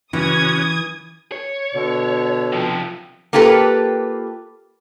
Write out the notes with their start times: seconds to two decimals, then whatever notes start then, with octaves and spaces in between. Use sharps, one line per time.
0.13 C#3 E3 C#4 F#4 D#6 G#6
1.32 C#5
1.74 B2 D3
2.52 C3 F3
3.33 A#3 F4 G4 A4 B4